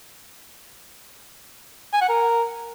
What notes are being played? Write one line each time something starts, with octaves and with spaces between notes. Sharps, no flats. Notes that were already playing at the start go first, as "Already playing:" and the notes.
G#5
F#5
A#4